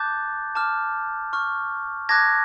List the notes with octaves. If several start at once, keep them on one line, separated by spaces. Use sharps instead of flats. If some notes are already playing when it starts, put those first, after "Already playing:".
Already playing: A5 D6 F#6 G6 A6
A5 D6 F6
C#6 F6
A5 D6 F#6 G#6 A#6